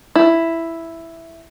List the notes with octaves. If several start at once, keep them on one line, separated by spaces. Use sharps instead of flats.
E4